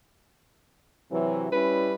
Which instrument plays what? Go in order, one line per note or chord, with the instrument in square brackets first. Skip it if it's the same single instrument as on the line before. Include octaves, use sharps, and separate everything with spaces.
[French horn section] C3 E3 F#3
[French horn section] G3 C#4 E4 [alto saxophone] B4